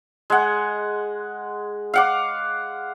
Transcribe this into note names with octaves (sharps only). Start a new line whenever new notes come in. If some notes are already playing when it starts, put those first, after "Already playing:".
G#3 F#5
F5 F#5 D6